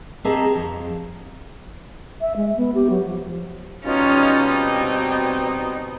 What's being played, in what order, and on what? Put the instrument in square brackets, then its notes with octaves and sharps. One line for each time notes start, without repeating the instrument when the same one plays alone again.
[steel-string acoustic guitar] C4 G4 G#4 D#5 A5 A#5
F2
[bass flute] E5
G#3
B3
G4
F#3
F3
[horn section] B2 G3 D#4 [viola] C#4 F4
[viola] C4